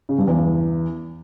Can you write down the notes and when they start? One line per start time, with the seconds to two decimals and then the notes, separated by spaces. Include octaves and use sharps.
0.09 C#3
0.18 G2
0.28 E2